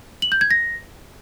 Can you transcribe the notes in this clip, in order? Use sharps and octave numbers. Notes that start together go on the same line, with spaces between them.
F#7
G6
G#6
A#6